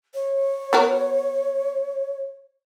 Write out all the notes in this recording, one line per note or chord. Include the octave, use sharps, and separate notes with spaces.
C#5
B3 F#4 A#4